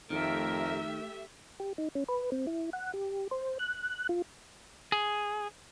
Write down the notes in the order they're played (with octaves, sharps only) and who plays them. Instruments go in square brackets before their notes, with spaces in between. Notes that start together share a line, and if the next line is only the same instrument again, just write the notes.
[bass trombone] F2 [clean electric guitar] D#3 [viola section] A3 G4 E5 [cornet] A#4
[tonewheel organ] G4
D#4
C#4
B4
C4
E4
F#5
G4
C5
F#6
F4
[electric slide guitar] G#4